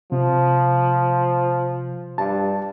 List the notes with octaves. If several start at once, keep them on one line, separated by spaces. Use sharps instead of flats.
C3 F3
G2 A5